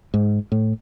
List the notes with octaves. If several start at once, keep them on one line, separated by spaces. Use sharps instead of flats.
G#2
A2